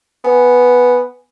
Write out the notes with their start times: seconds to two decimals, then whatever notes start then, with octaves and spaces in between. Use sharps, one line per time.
0.24 B3 G#5